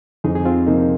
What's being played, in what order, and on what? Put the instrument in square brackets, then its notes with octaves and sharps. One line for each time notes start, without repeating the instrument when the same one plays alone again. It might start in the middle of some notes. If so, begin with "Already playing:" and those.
[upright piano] F2 [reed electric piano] D#4 G#4
[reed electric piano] G#4
C4 F4
[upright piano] C3 F3 A#3 D#4